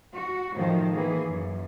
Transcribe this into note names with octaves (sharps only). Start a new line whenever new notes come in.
F#4
A2 D#3 F3 F#3
E3 A#3 G#4
F#2